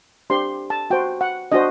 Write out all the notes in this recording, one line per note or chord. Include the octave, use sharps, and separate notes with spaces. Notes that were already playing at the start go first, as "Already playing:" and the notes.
D4 G4 C5 C6
A5
F#4 C5 G5
F#5
D4 F#4 C5 D#5